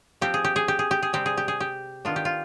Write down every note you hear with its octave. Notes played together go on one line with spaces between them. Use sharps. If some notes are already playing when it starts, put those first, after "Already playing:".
F3 C4 G4
G#4
G4
G#4
G4
G#4
G4
G#4
C3 G3 C4 G4
G#4
G4
G#4
G4
D#3 B3 D4 F4
G4
F4